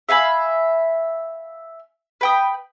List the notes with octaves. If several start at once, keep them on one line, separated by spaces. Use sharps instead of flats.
E5 F5 G#5 B5
B4 G5 D#6